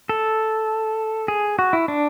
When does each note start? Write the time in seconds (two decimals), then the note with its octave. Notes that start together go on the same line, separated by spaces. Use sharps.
0.09 A4
1.28 G#4
1.59 F#4
1.73 E4
1.88 D4